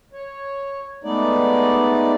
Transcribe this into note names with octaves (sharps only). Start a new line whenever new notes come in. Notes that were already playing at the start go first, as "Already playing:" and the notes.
C#5
G#3 A3 B3 D#4 D5